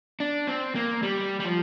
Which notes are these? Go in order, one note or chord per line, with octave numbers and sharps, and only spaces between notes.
D4
C4
A#3
G3
G3
F3